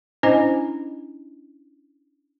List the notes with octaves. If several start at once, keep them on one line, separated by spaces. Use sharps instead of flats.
C#4 D4 E4 C5 D#5 G#5